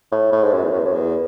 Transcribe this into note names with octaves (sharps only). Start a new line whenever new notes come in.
A2
A2
G#2
F#2
E2
F#2
E2
F#2
E2